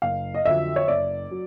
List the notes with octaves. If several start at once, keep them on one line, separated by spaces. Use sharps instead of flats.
F#1 F5
D#5
F2 D3 F#3 E5
C#5
F#1 D5
F#3